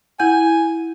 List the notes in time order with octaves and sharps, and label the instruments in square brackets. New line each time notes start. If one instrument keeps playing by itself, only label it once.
[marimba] E4 F#5 G6 [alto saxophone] G#5